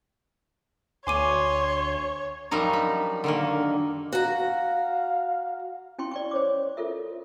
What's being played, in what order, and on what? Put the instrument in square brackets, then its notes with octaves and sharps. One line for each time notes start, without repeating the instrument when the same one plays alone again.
[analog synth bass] D2 [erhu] C#5 [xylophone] G#5 D6 D#7 [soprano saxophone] C6
[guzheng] F#2 F3 G3 D#4 A#5
B5
D3 D#3 A#3
[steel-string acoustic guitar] F#4 A#5 [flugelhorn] F5
[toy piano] C#4 E4 G5 C6 C#6
D5 G5 C#6
C5 C#5 D6
F4 A4 A#4 E5